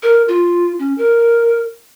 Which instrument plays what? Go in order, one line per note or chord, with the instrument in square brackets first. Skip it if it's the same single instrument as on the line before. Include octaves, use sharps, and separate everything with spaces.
[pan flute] A#4
F4
C#4
A#4